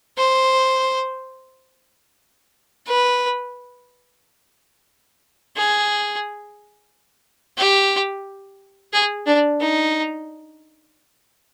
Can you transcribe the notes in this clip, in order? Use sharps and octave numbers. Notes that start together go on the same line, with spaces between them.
C5
B4
G#4
G4
G#4
D4
D#4